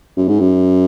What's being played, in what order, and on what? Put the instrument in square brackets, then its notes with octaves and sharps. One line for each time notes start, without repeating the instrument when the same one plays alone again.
[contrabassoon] F#2
G#2
F#2